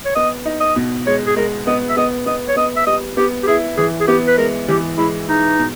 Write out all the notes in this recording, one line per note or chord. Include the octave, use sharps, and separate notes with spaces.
C#5
B3 D#5
D#4
D#5
B2
G#3 C#5
G#4
G#3 A#4
B3 D#5
E5
B3 D#5
B3 D#5
C#5
B3 D#5
E5
G3 D#5
B3 G4
G4
E4 G#4
E3 G#4
G#4
B3 G4
B4
G#3 A#4
E3 G4
G#3 E4
G#3 D#4
B2